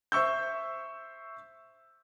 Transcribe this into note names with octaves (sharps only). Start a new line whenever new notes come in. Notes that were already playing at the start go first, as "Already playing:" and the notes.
C5 E5 C#6 E6 G6